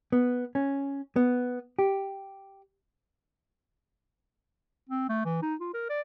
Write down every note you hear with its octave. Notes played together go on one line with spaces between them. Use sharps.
B3
C#4
B3
G4
C4
A3
E3
D#4
F4
A#4
D5